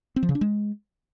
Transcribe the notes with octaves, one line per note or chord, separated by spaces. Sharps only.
C4
F3
C#3
D4
G#3